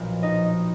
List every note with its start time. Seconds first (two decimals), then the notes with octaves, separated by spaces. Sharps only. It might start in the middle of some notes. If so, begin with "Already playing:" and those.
Already playing: B1 A#2 F3 F5
0.23 D#4 D#5